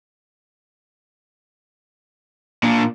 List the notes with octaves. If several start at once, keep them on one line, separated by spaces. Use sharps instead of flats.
A#2 A#3 D4